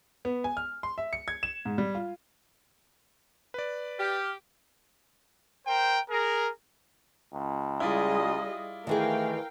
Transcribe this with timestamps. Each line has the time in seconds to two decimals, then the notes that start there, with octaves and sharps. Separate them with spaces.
0.25 B3
0.44 G#5
0.57 F6
0.83 C6
0.98 E5
1.13 C#7
1.28 G#6
1.43 E7
1.65 G#2
1.78 G3
1.95 F4
3.54 B4 D5
3.99 G4 F6
5.67 A#4 C5 G5
6.10 G#4 A#4
7.34 C#2
7.80 G3 E4 F4 G#4 D5 D#5
8.87 D#3 E3 A3 G#4 A#4 F5 G5